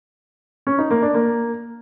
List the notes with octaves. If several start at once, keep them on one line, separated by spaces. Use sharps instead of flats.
C#4
D#4
A#3
D4
A#3